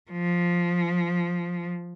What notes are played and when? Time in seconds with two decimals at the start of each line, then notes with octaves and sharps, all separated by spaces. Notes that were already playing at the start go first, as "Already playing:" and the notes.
0.11 F3